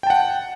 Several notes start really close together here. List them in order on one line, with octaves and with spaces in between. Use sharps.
G5 A5 F#5